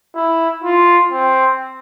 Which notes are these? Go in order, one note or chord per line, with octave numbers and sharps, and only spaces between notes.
E4
F4
C4